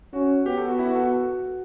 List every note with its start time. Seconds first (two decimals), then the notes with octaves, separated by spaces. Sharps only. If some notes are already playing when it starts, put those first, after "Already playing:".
0.13 C#4 F#4
0.46 B3 G4
0.58 A4
0.68 F#4
0.79 E4
0.88 F#4
0.95 A4
1.04 F#4